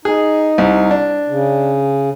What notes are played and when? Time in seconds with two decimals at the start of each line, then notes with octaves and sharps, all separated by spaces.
0.05 D#4 G#4
0.58 C2
0.91 D4
1.28 C#3